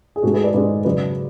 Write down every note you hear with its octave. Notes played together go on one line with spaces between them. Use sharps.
G#4
G#2 G#3 F#4 A4
G#4 B4
B4 D5
G#2 G#3 B4 D5
F#2 C#3 F#3 B4 D5